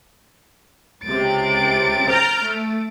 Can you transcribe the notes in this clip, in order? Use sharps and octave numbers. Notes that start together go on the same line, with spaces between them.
C#2 C3 A6 D7
A#5 F6 G6
A3